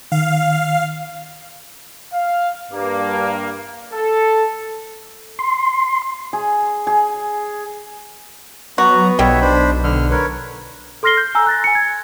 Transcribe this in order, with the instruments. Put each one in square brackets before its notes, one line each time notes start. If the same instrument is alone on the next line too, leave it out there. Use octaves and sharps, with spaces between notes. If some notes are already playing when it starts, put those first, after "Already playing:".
[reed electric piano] D#3 [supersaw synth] F5
[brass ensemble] F5
G2 A#3
A4
[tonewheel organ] C6
[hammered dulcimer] G#4
G#4
[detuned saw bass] F#3 [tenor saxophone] B3 [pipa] F#4 [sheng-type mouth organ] A#5
[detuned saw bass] B1 [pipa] B2 G3 [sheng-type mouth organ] C#5 E5
[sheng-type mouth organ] D4 C5 B5
[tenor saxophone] D3 [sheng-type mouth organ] F6
[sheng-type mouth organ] A#4 B4 C#5
[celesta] A4 C6 F6 A#6 C7 G7
G6
G#5 A#5 E6
F#6 A6 A#6
G#5 C#7
G#6